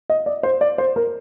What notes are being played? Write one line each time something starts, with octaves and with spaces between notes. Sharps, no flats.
D#5
D5
C5
D5
C5
A#4